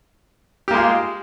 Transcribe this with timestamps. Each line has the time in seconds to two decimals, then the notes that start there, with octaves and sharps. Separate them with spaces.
0.68 G4
0.71 A#3
0.74 G#3
0.77 F4